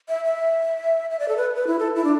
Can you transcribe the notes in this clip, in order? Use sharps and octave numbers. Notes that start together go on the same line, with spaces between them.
E5
E5
E5
D5
A4
B4
B4
E4
A4
E4
D4